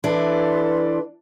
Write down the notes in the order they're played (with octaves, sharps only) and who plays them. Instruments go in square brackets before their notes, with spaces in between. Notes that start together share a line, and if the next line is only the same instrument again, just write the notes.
[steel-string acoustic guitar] E3 D4 [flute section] A4 B4 C6